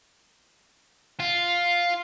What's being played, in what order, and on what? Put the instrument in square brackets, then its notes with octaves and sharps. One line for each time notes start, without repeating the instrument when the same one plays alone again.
[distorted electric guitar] F4